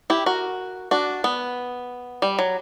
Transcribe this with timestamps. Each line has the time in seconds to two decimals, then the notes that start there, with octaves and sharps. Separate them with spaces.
0.10 E4 G4
0.26 F#4 A#4
0.91 D4 F#4
1.24 B3
2.22 G3
2.39 F#3